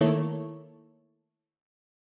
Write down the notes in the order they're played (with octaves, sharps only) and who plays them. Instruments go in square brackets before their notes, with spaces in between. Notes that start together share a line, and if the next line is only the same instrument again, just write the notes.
[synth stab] D#3 A3 A#3 E4 A4 C#5